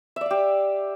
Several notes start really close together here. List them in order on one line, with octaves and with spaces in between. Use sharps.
E5 D5 F5 G4